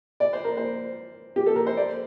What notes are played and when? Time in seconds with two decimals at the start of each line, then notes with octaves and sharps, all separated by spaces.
0.20 D5
0.33 C5
0.45 A#4
0.57 C5
1.36 G4
1.46 A4
1.56 A#4
1.67 C5
1.77 D5